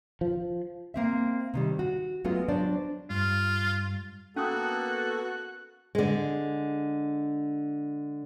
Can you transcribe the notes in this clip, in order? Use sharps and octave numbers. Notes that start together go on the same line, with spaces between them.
F3
A#3 C4 E5
C3 D#3 G3
F#4
F#3 G#3 A3 B3 C#4 F4
F#3 D4 C5 D5
G2 F4
A#3 B3 C#4 F#4 A4 D#6 F#6
D3 G#3